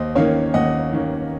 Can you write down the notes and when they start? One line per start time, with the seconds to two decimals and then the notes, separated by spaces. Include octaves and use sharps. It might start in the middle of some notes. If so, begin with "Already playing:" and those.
Already playing: D#2 C5 D#5
0.15 D#3 A#3 C#4 C#5 F5
0.54 D#2 D#5 F#5
0.93 D#3 A#3 C#4